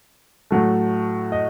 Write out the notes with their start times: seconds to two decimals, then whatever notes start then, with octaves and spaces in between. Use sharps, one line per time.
0.51 A2 F#3 A3
1.32 D#5